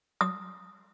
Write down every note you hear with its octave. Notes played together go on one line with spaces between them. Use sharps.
D#6